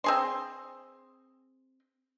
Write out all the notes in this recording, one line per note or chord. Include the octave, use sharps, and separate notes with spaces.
C4 G#4 C6